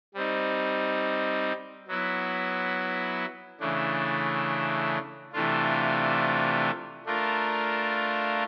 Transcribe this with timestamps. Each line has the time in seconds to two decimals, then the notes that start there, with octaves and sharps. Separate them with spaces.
0.14 G3 C4 D#4
1.87 F#3 B3 E4
3.60 C#3 E3 A3 D4
5.33 C3 E3 A3 D4 F4
7.06 A3 D4 F4 A#4